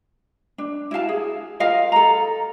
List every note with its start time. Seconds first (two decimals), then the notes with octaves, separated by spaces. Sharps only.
0.58 D4
0.91 E4 F#4 F5 A5
1.09 G#4
1.60 F4 A#4 D#5 F5
1.92 A4 A#5